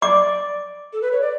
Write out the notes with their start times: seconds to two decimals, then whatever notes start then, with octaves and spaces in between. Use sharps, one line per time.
0.02 D5 D6
0.93 A4
1.02 B4
1.12 C#5
1.21 D5